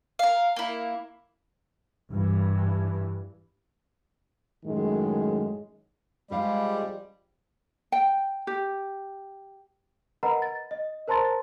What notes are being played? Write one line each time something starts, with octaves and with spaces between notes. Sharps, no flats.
A#4 F5
A#3 E4
G2 E3
F#2 A2 D#3 G#3
F3 G3 G#3 G4 D5 F5 B5
G5
G4
A#4 B4 D#5 F#5 A#5 B5
A6
D#5
A#4 C5 A5 A#5 C6 A6